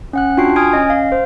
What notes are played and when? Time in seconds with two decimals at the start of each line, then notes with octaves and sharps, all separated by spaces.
0.13 C#4 F#5 F#6
0.37 D4 F4 F#4 G5 C7
0.56 G#5 D#6 F6 G#6 D7
0.73 C#4 D#5
0.90 F5
1.12 C5